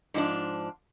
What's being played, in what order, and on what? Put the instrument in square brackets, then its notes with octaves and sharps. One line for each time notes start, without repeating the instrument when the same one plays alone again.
[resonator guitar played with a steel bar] G#2 F3 D4